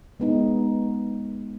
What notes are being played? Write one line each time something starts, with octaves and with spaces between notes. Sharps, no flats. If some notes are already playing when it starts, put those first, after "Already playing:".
G#3 B3 D#4